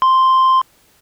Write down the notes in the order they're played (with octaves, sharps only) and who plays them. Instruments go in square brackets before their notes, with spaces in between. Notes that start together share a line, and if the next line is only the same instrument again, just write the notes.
[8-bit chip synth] C6